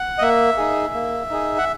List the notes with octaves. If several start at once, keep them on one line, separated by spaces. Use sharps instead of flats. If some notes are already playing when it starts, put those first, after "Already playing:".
Already playing: F#5
D#5
A#3 E5
D#4 G#4
A#3
D#4 G#4
F#5